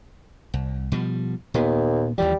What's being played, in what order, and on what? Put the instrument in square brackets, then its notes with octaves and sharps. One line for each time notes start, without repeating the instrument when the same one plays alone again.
[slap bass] C2
B2 F3 G3
[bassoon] D#2 [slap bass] A#2 B3
[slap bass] D#2 E3 F3 [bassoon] G3